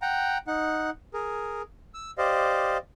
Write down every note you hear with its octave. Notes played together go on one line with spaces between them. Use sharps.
F#5 G5 A#5
D#4 F#5
G#4 A#4
E6
G4 C5 D5 D#5 F5